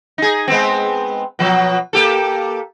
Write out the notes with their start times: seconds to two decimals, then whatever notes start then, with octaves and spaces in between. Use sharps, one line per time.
0.18 D#4 G#4
0.48 G#3 B3 C4
1.39 B2 F3 F#3
1.93 A#3 G4 A4